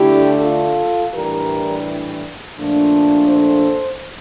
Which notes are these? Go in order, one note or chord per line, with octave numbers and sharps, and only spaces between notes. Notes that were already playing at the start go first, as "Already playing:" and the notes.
Already playing: D3 A3 D4 E4 G4
F4 A4
A2 E3 G3 D4 G4 A#4
A#2 F3 A3 D4
A4 C5